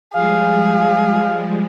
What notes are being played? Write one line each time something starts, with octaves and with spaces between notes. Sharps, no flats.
F3 G3 G#3 G#4 F5